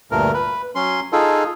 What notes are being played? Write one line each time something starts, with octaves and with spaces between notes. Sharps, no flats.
D2 G2 A#2 A3 A#4
B4
F#3 C#4 C6
D#4 F4 G#4 A4